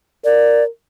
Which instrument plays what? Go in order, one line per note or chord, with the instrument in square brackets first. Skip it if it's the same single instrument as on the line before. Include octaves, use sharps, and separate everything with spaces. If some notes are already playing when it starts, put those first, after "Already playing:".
[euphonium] A#4 [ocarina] D5